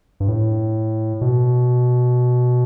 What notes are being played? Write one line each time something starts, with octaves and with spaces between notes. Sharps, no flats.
G2
A2
B2